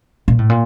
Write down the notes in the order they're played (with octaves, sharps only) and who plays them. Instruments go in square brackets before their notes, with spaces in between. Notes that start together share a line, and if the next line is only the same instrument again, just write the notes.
[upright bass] A#2
A2
A#2